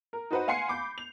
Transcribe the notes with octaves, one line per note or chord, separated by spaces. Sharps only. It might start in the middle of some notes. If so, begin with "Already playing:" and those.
A#4
D#4 F#4 B4 C5 F#5
F5 F#5 G#5 C6 C7 C#7
B5 D6 G6
F7